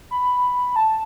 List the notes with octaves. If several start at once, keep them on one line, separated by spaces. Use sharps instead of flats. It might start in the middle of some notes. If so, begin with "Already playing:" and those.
B5
A5